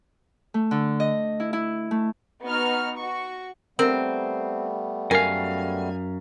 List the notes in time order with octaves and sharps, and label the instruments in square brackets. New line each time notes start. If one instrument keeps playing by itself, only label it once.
[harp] A3
D3
D#5
E4
E4
A3
[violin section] B3 D#4 F#4 F6
F#4 C#6
[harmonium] G3 A3 B3 [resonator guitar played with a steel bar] C4 [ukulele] A#4
[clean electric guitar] F#2 F5 [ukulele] A#4 [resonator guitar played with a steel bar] G#5